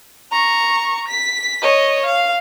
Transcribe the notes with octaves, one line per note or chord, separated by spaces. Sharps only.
A#5 C#6
B6
C#5 D#5
F5